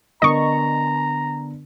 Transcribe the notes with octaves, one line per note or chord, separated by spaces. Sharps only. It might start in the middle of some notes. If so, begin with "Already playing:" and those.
D3 B3 A#4 D#5 A#5 C#6